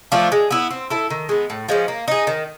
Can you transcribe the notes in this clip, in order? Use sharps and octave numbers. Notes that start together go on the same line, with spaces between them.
F3 A3 D4
G#3
B3 E4
C4
E4 A4
D#3
G#3 B3
A2
F3 G#3 C#4
A#3
D#4 G#4
D#3